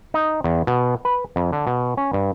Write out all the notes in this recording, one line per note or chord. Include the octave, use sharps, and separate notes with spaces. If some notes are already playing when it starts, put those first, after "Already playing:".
D#4
E2
B2
B4
F2
D3
B2
C#4
G2